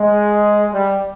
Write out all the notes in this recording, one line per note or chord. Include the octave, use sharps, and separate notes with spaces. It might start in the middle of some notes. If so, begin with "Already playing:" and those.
Already playing: G#3
G3